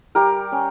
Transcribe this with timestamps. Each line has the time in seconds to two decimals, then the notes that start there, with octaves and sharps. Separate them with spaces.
0.15 G3 G4 A#4
0.52 C#4